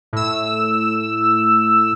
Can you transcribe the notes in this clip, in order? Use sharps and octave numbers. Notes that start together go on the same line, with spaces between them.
A2 E6